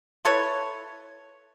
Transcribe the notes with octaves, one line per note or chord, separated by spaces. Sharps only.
E4 A4 B4 C#5